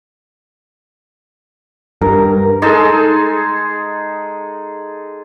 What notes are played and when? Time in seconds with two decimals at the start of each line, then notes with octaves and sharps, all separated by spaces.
2.02 G2 A#4
2.62 G#3 D#4 G#4 A4